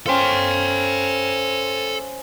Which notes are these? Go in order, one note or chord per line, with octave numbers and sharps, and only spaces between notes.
C#4 A4 C5 F5 G5